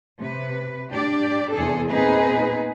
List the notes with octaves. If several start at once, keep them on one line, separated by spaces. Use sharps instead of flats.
C3 B4
D4 G4 D5
E2 C3 G#4 A4
A#2 B3 C4 D#4 G#4 B4